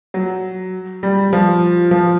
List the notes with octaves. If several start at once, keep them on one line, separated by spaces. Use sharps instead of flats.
F#3
G3
F3
F3